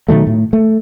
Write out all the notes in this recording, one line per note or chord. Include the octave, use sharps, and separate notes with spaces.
B2 D#3 F#3 A3
A2
A3